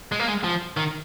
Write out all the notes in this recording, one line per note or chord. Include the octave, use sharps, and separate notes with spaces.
G#3
A#3
G#3
F3
D#3